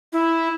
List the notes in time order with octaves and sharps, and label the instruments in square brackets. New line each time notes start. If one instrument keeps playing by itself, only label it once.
[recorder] E4